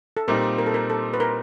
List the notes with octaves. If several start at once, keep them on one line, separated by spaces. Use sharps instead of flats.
A4
A#2 G3 C4 D#4 A#4
A#4
A4
A#4
A4
B4
A#4